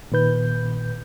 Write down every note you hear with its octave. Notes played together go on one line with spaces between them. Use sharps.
A#2 D#3 B4 G6